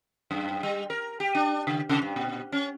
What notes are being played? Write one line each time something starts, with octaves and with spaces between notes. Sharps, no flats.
F#2
G3
A#4
G4
D4
C#3
C3
G2
A#2
C#4